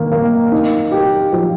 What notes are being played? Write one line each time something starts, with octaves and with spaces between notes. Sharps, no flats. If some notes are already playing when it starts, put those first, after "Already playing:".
Already playing: D#3 A#3
A#3
D#4
G4
F3